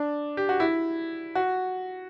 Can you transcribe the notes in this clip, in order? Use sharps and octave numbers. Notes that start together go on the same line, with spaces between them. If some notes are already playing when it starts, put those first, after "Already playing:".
Already playing: D4
G4
F#4
E4
F#4